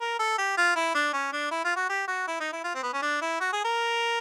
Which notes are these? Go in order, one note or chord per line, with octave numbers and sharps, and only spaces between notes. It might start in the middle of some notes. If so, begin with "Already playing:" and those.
A#4
A4
G4
F4
E4
D4
C#4
D4
E4
F4
F#4
G4
F#4
E4
D#4
E4
F4
C4
B3
C#4
D4
E4
F#4
G#4
A#4